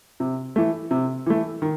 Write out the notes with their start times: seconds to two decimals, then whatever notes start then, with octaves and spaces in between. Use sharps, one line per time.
0.20 C3
0.56 E3 A3
0.91 C3
1.26 E3 A3
1.62 D#3